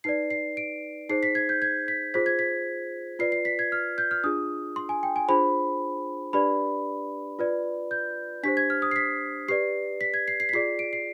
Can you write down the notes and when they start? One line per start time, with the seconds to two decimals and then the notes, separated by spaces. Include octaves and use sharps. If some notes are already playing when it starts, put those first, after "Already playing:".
0.04 D#4 B4 D5 C7
0.30 C7
0.57 D7
1.09 D#4 G#4 C5 C7
1.23 B6
1.35 G#6
1.49 G6
1.62 G#6
1.88 B6
2.14 F4 G#4 C5 B6
2.26 G#6
2.39 B6
3.19 F4 B4 D5 C7
3.32 C7
3.45 B6
3.59 G#6
3.72 F6
3.98 G6
4.11 F6
4.24 D4 F4 G#4 D#6
4.76 C6
4.89 G#5
5.03 G5
5.16 G#5
5.28 D4 F4 G#4 C5 B5
6.33 D4 G4 B4 D5 B5
7.39 F4 B4 D5
7.91 G6
8.43 D4 G4 C5 B6
8.57 G#6
8.70 F6
8.82 D#6
8.91 C7
8.96 B6
9.48 G4 B4 D5 C7
10.01 B6
10.14 G#6
10.28 C7
10.40 C7
10.49 B6
10.53 F4 G#4 D5 C7
10.79 D7
10.93 C7